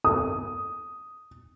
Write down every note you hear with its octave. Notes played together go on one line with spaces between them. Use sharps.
D#6